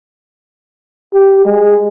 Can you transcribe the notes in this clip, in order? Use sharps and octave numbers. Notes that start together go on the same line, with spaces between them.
G4
G#3